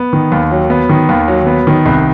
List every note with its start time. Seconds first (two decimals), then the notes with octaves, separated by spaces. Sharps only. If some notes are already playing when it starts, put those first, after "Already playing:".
Already playing: B3
0.13 D#3
0.32 D#2
0.51 F#3
0.70 B3
0.89 D#3
1.09 D#2
1.28 F#3
1.47 B3
1.67 D#3
1.86 C2